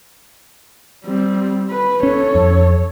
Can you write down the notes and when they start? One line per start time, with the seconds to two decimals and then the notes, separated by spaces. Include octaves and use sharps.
1.05 G3 C4
1.70 B4
2.03 C#4 A4 C#5
2.35 F2